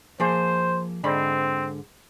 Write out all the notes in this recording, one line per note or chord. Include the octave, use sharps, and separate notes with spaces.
F3 A#3 G#4 C5
G#2 D3 C4 B5